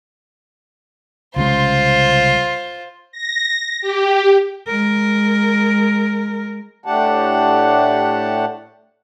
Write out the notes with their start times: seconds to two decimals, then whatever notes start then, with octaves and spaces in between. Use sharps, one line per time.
1.36 C2 C#3 G#3 F4 C5
3.12 A#6
3.81 G4
4.67 G#3 A#4
6.86 A2 A3 D4 G4 F#5 A5